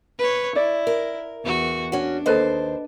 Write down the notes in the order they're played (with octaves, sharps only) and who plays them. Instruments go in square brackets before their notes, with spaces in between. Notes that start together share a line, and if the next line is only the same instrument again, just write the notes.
[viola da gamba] B4 C#5
[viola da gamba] E4 [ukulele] D5
[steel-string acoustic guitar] A#4
[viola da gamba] E2 F#4
[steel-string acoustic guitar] C#4 F#4 [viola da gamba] D4
[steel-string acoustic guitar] D#2 C5 [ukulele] A4 B4 D#5